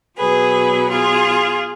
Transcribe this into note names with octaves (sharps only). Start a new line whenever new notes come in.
B2 F#3 G#4 B4
F4 G#4